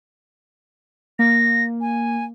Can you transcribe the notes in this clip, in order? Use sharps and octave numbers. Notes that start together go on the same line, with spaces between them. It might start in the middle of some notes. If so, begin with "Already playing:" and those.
A#3 A#6
G#5